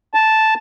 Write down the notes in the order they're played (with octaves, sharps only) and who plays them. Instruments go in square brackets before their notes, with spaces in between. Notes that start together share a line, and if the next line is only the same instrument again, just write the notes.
[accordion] A5